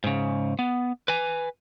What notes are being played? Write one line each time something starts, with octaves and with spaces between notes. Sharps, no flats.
G#2 C#3
B3
B4 G#5